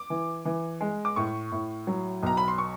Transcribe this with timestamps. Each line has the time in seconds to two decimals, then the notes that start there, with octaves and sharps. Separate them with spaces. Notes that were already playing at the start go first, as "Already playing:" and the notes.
Already playing: D6
0.10 E3
0.45 E3
0.81 G#3
1.05 D6
1.16 A2 C#6
1.52 A2
1.87 F#3
2.23 B1 A#5
2.37 B5
2.48 C6
2.58 C#6